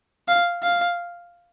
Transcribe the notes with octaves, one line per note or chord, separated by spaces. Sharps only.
F5
F5